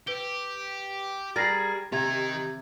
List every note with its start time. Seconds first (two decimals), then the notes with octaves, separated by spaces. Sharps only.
0.07 G4 B4 D7 G7
1.36 G3 G#4 A#4 A6 A#6 C7
1.92 C3 D#3 G4 A#5 G#6